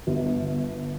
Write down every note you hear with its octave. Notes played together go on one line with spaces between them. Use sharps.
G1